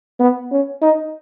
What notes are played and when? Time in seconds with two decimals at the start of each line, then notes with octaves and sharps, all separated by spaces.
0.20 B3
0.51 C#4
0.82 D#4